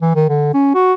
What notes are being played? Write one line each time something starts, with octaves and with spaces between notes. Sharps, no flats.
E3
D#3
D3
C#4
F#4